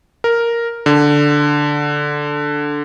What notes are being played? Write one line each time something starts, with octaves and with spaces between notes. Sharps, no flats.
A#4
D3